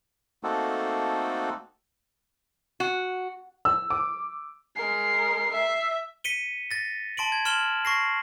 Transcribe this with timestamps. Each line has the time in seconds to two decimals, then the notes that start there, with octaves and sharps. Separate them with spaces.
0.43 A3 A#3 C4 D#4 F#4 A4
2.80 F#4
3.65 E6
3.90 D6
4.76 G#3 A#4 C7
5.52 E5
6.24 B6 C#7 D#7 G7
6.71 A6 A#6
7.17 A5 C6 D7 F#7
7.32 G#6
7.45 C6 F6 E7 F#7 G7
7.85 C#6 A#6 C7